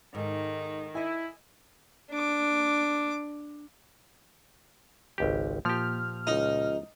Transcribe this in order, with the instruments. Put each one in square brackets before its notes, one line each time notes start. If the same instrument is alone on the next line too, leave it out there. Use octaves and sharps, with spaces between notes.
[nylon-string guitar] G#2 A4 [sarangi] D#3
[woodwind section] E4 [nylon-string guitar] D#5 G#5
[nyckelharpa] D4 D6
[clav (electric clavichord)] G#1 C#2 G4
[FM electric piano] A#2 F6 [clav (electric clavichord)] F3 G4
[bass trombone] C#2 [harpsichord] D#4